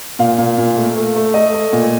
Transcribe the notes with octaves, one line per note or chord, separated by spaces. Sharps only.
A#2 F5
A#2
A#2
A3
A3
A3
A3 D#5
A3
A#2